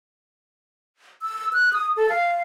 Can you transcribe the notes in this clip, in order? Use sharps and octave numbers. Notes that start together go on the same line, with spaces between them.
E6
F#6
D#6
A4
F5